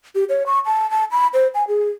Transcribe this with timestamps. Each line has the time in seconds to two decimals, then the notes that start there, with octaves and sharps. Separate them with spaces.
0.15 G4
0.29 C#5
0.46 C#6
0.66 A5
0.91 A5
1.11 B5
1.34 C5
1.55 G#5
1.68 G#4